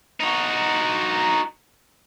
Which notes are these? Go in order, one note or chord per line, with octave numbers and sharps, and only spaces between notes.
D#4 F#4